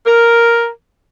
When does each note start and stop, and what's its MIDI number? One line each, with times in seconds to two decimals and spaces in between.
0.06 0.69 70